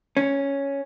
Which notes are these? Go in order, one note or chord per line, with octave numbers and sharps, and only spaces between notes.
C#4